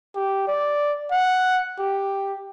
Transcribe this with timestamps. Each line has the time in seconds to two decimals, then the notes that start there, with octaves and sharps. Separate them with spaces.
0.16 G4
0.48 D5
1.11 F#5
1.79 G4